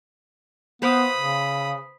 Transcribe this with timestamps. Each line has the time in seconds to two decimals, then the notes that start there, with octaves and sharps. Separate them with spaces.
0.82 B3 B4 C5 F5 B5 D#6
1.17 C#3